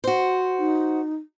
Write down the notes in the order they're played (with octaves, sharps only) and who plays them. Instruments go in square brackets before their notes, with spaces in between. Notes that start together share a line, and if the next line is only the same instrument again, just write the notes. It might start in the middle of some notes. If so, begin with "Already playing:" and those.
[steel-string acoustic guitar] F#4 C5
[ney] D#4